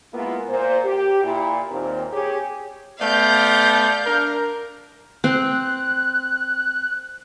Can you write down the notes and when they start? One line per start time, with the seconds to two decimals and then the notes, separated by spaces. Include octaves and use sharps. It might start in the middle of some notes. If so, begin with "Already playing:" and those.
0.13 G#3 A#3 B3 E4 F4
0.48 A#2 C5
0.84 G4
1.23 A#2 E4
1.71 D#2 A#2 C4
2.12 G4 G#4 C#5
3.00 A3 B3 D5 F5 G6
4.05 D4 A#4
5.24 C4 F#6